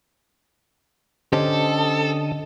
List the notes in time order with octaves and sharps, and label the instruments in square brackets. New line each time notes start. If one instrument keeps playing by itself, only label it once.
[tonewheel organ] D3 D#5 [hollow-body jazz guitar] C#4 G4 C5 [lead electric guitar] A4